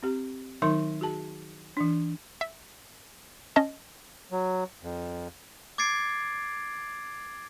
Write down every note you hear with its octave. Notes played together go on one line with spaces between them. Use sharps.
C4 G4
D#3 F#3 D#4 A#4 C6
F#4 G#4 A5
E3 D4
E5
C#4 D#5 A5
F#3
F2
D6 G#6 A6 C7 D7